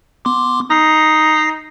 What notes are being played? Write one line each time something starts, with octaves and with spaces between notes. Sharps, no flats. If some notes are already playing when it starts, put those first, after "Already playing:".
B3 C6 D6
D#4 A#6 C7